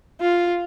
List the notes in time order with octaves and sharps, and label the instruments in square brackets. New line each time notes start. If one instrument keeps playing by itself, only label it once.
[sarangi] F4